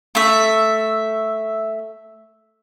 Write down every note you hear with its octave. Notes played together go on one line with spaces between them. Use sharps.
A3 E5